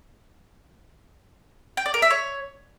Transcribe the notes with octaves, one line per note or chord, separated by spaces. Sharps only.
G5
D5
A#4
E5
C#5